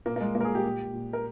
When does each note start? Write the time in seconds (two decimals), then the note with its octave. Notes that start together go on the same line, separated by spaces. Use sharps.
0.06 A#2 A#3
0.16 A#3
0.21 G#3
0.35 A#2 A#3
0.41 A#4
0.45 G#4
0.55 G4
0.64 A#2
0.93 A#2
1.13 A#4